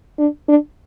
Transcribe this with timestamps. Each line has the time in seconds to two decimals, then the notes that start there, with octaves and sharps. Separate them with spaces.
0.19 D4
0.48 D4